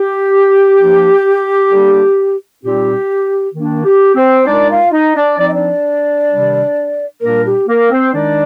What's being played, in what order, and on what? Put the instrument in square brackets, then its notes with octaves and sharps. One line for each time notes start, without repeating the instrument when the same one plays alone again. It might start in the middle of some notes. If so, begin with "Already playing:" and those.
Already playing: [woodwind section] G4
F3 A#3 D4
D3 G3 A#3 D4
A#2 G3 C4 D#4 G4
D#3 A#3 D4
G4
C4 C5
A#2 G#3 D4 D#4 D5
F4 F5
D#4 D#5
D4 D5
F3 C4 D#4 D5
D#5
D4 D5
C3 D#3 G3
A#2 G3 A#3 D4 A#4
G4
A#3 A#4
C4 C5
D#3 G#3 D4 D#4 D5